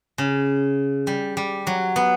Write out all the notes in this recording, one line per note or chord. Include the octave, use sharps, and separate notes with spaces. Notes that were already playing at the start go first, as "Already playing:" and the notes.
C#3
G3
G3
F#3
B3